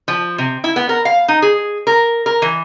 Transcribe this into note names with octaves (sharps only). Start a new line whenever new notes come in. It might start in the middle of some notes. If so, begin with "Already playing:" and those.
F3
C3
E4
B3
A#4
F5
D#4
G#4
A#4
A#4
E3